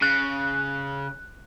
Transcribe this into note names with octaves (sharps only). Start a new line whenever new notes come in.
C#3 F#6